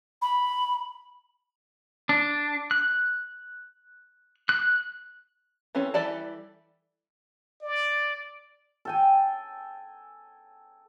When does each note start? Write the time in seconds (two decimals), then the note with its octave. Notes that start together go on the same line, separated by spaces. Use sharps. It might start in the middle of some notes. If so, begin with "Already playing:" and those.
0.22 B5
2.09 D4
2.71 F#6
4.49 F#6
5.75 E3 C4 C#4 A4
5.94 E3 G3 A4 D5 A5
7.62 D5
8.85 A4 G5 G#5